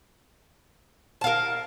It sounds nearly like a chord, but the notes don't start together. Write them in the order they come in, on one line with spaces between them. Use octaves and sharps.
A5 F5 A#4